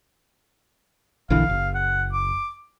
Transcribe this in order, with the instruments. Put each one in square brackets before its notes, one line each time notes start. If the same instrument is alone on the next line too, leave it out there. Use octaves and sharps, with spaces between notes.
[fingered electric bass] A#1 D3 E3 [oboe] F5
[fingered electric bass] F#1
[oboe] F#5
D6